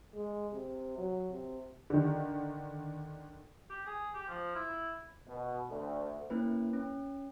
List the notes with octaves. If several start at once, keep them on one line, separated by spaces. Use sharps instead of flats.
G#3
C3
F#3
C3
D3 D#3
G4
G#4
G4
F3
E4
B2
D2
A#3 C#4 E4 B4
C#4